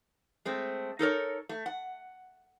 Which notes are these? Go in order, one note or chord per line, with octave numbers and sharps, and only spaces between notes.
G#3 A3 C4
D#4 A4 A#4 C#5
A3
F#5